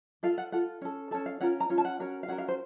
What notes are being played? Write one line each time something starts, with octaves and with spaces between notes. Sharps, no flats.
F4 A4 F5
F#5
F4 A4 F#5
C#4 A4
C#4 A4 A5
F5
C#4 F4 A#4 F#5
A#5
C#4 F4
A5
F#5
C#4 F#4 A#4
F5
C#4 F#4 A#4 F#5
F5
C5